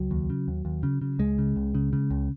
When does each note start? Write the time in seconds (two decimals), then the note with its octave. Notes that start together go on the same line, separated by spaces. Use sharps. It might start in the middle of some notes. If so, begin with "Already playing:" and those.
Already playing: C#2 F#3
0.11 D#2
0.30 C#3
0.48 D#2
0.65 D#2
0.83 C#3
1.02 C#3
1.19 C#2 G#3
1.38 C#3
1.56 C#2
1.75 C#3
1.93 C#3
2.11 C#2